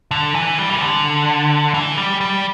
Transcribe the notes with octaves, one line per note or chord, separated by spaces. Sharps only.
D3
E3
G3
E3
D3
E3
G3
G3